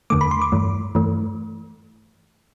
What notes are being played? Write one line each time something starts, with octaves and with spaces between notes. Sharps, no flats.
E2 D3 A3 D6
B5
C6
D6
G2 E3 A3
G2 E3 A3